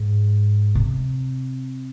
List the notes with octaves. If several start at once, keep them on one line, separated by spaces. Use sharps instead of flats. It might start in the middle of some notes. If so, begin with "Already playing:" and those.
Already playing: G#2
C3